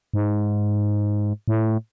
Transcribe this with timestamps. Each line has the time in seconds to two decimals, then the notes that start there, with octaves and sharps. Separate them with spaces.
0.14 G#2
1.48 A2